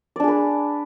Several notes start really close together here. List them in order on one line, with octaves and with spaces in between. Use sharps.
D5 D4 G#4 B4